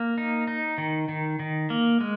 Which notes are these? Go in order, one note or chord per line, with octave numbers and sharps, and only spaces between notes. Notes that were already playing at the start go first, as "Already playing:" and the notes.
Already playing: A#3
D#4
D#4
D#3
D#3
D#3
A#3
G#3